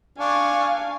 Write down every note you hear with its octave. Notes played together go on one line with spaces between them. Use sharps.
D4 F5 G#5 C#6